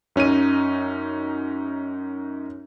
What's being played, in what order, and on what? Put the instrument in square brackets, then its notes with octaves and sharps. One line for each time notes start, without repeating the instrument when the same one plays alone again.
[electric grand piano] F#2 C#4 D#4 D#7